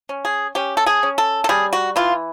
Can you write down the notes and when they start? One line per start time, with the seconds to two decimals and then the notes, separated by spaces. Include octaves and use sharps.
0.09 C#4
0.25 G#4
0.55 C#4 G4
0.77 A4
0.86 G#4
1.03 C#4
1.18 A4
1.44 A4
1.49 G3 G#4
1.73 F#4
1.96 E3 F4